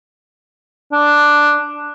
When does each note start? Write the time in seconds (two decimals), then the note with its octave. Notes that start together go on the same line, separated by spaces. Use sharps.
0.92 D4